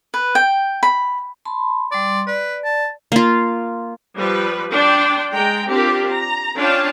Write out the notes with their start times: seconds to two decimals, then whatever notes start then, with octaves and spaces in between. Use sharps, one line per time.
0.14 B4
0.35 G5
0.83 B5
1.45 A5 B5 C6
1.91 G3 D5 C6
2.27 B4 D5
2.64 A5
3.12 A#3 F4
4.17 F3 G3 B4
4.72 D4 G5 C6
5.33 G#3 G5 A#5
5.68 C4 D4 F4 G4 A#4
6.11 A#5
6.57 C#4 D4 F4 F5 G5 A5